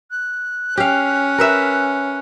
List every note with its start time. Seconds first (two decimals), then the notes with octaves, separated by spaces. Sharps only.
0.11 F#6
0.77 C#4 G4 F5
1.38 A#4 B4 E5